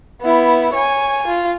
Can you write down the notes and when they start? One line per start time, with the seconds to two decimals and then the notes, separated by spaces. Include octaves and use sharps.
0.22 B3 E4
0.73 C#5 G#5
1.27 F4